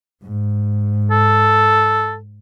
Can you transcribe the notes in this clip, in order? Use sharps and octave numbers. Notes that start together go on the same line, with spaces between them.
G#2
A4